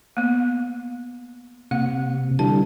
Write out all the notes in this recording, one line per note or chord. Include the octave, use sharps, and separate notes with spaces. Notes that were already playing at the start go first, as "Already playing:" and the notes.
A#3 B3
C3 A#3 F#5
D3 E3 G3 A5